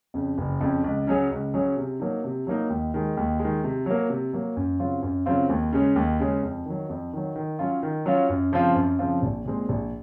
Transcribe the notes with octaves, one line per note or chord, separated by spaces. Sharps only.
F2 C#3
F#1
F2 C#3
C#2
C#3 F#3 C#4 G#4
C#2
C#3 F#3 C#4 G#4
C3
F#3 A#3 D#4
C3
F#3 A#3 D#4
D#2
D#3 G#3
D#2
G#3
D#3
C3
F#3 A#3
C3
F#3 A#3
F#2
C#3 F#3 C4 F4
F#2
C#3 F#3 C4 F4
D#2
C#3 G#3 C#4
D#2
C#3 G#3 C#4
F2
D#3 F#3
F2
D#3 F#3
D#3
F#3 C#4 F4
D#3
F#3 C#4 F4
F#2
C#3 F3 C4 F4
F#2
C#3 F3 C4 F4
A#1
A#2 G#3 C4
A#1